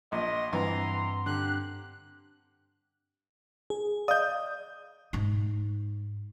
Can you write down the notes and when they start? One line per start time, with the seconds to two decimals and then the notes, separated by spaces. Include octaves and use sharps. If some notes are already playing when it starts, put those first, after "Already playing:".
0.12 A#1 D#5 C6
0.53 G2 E3 C4 F#5 A#5 C6
1.26 D3 G4 F#6
3.70 G#4
4.08 D5 D#5 F5 D#6 G6
5.13 G#2 D#4